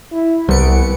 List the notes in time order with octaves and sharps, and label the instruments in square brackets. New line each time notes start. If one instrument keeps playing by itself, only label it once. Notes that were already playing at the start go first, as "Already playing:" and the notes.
[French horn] E4
[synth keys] C2 C#7 D7 [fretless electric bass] G3 [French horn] B3